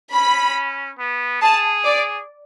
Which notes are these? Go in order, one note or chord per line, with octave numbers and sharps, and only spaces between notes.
C#4 B5
B3
G#4 A5
D5